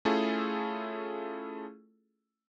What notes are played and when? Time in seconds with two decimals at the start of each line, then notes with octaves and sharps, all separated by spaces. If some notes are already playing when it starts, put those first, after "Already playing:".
0.05 A3 C#4 E4 F4 G#4 A4